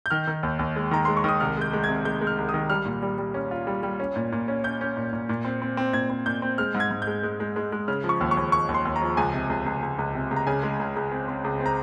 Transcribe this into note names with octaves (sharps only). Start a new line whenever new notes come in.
G6
D#3 F6
D#3
D#2
D#2
G#3
D#3 A#5
G#3 C6
C#6
D#3 D#6
C2 F6
G#3 G6
G#3
C3 G#6
G#3 G6
G#3
F6
C2
D#6
D#3
G3 F6
A#2
G3
G3
C#4
F4
G3
G3
C#4
A#2
A#2
C#4
C#4 G6
C#4
A#2
A#2
A#2
C4
C4
C4
A#2 G#6
C4
A#2 G6
C4
G#3 F6
G#2
G#6
G#2
G6
G#3
G#3
G#3
G#3
G#3
C#3 F6
F3
C#6
D#2
C#6
D#2
D#2 C#6
D#2
C6
D#2
A#5
F3
C#2 G#5
C3
C#2
C#2
C#2
C#2
C3
C#2
A#5
C#3 G#5
G#3
C#2
C#2
C4
C4
C#2
C4
A#5